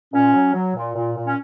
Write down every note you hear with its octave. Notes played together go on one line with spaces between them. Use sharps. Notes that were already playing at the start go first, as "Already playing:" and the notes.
A#2 C#4
F#3
F#3
A#2
A#2
A#2
C#4